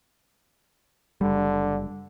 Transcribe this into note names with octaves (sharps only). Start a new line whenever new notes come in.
F#1 D3 G3